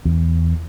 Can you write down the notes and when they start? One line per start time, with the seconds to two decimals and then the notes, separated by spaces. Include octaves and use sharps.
0.05 E2